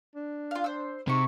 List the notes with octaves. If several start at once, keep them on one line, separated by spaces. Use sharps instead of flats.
D4
F4 F5
C5 E6
C3 D#4 G#4 C#6